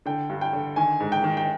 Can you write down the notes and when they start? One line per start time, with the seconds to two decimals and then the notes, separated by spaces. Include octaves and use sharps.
0.06 D3 G5
0.29 G2
0.41 G5
0.53 D3
0.76 D#3 G#5
1.00 G#2
1.12 G5
1.24 D#3
1.37 G5